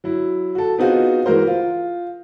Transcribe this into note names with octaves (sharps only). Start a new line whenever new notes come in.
F#3 E4
F#4 A4
B3 C4 D#4 F4 F#4 G#4
E3 G#3 F#4 A#4 C5
F4